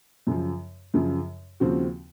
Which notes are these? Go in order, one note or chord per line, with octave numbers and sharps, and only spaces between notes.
F#2 C#3 F3
F#2 C#3 F3
D#2 C#3 F3 C4 F#4